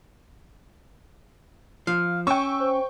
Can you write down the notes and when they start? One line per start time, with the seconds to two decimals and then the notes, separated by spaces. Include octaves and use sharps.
1.87 F3 F5
2.27 C#4 G5 C#6 E6
2.60 C5